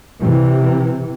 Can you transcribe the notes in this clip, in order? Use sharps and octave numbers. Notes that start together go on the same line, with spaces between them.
C3 E3